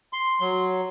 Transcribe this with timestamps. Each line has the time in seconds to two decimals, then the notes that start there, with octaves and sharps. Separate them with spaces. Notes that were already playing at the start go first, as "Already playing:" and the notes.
0.13 C6
0.40 F#3